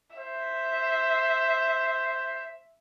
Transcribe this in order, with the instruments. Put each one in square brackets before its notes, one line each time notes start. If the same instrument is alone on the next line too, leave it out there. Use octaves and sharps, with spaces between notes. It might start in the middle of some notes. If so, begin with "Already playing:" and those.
[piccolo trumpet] C5 [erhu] E5